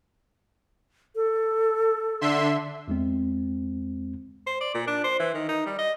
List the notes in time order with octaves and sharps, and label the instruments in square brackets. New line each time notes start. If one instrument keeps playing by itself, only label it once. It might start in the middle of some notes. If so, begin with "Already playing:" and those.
[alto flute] A4
[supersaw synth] D3 E5 C6
[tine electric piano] E2 G#3 C4
[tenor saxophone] C5
D5
A#2
D4
C5
E3
D#3
D#4
G3
D#5